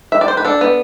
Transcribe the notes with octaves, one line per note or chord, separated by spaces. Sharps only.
E5
D5
C5
B4
D4 A4
B3